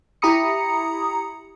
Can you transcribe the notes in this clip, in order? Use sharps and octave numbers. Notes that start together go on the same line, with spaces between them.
E4 G4 A#5 B5 D#6 C#7